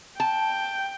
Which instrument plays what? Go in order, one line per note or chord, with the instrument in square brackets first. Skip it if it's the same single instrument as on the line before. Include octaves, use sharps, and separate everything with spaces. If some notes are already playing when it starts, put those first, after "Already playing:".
[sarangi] G5 [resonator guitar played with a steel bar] A5